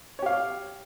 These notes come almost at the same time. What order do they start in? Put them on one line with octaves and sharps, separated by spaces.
C#5 G4 F5